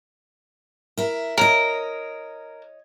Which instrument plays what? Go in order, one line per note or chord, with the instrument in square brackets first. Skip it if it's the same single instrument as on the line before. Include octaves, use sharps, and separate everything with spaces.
[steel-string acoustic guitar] E4 A#4
[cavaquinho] A#4 [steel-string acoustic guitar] C#5 D#5